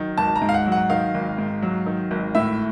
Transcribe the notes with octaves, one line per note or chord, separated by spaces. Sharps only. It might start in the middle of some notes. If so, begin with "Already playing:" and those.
Already playing: D#3 F#3
G#1 A5
A#5
G#2
F5
F#5
F#3
F#5
D#3 F5
G#1
G#2
F#3
D#3
G#1
A2 E5